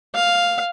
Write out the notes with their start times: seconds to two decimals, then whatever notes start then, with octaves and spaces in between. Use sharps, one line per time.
0.14 F5